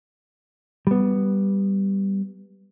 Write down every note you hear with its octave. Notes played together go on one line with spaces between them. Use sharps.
G3 B3